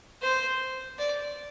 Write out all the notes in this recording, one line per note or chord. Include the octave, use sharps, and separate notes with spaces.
C5
D5